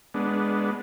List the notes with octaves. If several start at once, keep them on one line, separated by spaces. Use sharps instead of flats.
G#3 B3 D4